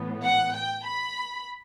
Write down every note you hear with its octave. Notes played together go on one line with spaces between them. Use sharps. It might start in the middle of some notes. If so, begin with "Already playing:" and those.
Already playing: A2 E3 B3
F#5
G5
B5